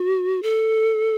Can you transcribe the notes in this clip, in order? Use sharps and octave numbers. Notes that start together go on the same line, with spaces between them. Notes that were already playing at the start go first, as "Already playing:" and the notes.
Already playing: F#4
A4